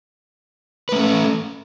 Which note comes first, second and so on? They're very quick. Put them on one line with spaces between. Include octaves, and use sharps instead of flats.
B4 A3 C#4 A4